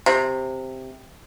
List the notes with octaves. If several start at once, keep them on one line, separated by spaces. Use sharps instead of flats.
C3